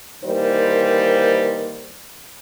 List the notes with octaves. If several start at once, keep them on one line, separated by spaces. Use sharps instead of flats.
D#3 E3 G3 A#3 C5 D#5